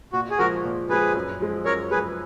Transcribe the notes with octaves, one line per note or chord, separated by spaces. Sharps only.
A#2 F#4
G#4
F3 G#3 F#4 A#4
A#2
F3 G#3 G#4 B4
F#2
F3 G#3
F#2 A#4 C#5
F3 G#3 G#4 B4